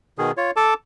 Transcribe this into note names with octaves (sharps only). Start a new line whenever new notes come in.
B2 D#3 G#4
F4 C#5
A4 A5 D6